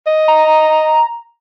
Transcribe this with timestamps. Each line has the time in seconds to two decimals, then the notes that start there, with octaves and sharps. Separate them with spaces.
0.07 D#5
0.28 A#5